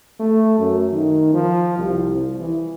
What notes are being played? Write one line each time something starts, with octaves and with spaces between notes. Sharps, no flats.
A3
F#2
D#3
F3
C2
E3